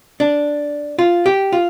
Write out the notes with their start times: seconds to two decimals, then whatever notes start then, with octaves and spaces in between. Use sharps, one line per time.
0.20 D4
0.99 F4
1.26 G4
1.53 F4